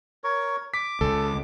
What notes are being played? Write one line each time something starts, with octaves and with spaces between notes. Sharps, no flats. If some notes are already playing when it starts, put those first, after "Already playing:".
A#4 C#5 C#6
D6 B6
C#2 A4